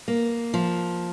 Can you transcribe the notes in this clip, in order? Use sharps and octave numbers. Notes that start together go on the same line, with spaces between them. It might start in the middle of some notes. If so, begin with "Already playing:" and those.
A#3
F3